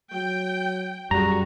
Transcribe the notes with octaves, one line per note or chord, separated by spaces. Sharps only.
F#3 G5
F#2 G3 F#4 G#4 A#5